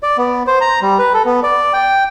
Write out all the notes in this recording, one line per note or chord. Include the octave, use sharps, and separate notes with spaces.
D5
B3
C5
A#5
G3
B4
A4
B3
D5
G5